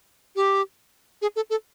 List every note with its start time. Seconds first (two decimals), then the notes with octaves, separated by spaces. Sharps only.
0.36 G4
1.22 G#4
1.36 A4
1.50 A4